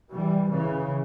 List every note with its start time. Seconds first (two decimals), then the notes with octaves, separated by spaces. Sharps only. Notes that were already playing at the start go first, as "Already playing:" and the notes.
0.11 E3 G3
0.49 C#3 E3